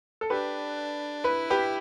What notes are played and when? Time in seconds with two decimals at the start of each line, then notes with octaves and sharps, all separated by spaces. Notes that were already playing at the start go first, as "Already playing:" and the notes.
0.21 A4
0.30 D4 G4 B4
1.24 E4 B4
1.50 G4 B4